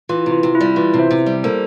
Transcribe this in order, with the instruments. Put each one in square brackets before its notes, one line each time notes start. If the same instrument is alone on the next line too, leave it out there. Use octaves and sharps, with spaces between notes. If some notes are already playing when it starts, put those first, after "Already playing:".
[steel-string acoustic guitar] E3 [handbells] F4
[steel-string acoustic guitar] C3
[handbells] F4
[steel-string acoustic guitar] C3
[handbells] E4
[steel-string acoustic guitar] G3
[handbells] E4
[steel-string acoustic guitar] E3 [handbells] F4
[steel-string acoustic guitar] C3
[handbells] C5 E5
[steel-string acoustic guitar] C3
G3
[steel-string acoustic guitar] A#3 [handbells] A4 C5